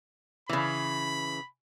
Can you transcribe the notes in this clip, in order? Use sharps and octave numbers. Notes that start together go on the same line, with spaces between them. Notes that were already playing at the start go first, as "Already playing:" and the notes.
C#3 E3 B5